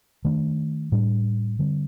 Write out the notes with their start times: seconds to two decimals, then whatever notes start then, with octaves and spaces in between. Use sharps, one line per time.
0.25 D#3 A3 D4
0.92 A2 G3 D4
1.59 D3 G3 C4